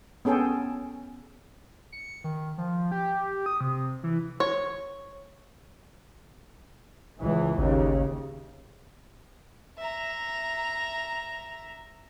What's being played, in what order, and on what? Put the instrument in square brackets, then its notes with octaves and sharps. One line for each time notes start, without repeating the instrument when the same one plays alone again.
[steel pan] B3 C#4 G#4 A4 G5
[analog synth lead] C#7
D#3
F3
G4
D#6
C3
E3
[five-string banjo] C#5
[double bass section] C#2 E3
[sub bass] G#1 [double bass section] D#2 C#3
[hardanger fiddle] E5 A#5